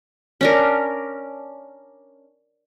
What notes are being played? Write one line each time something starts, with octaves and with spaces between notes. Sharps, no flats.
C#4 D4 A#4